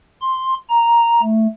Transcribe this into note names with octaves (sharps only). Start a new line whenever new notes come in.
C6
A#5
A3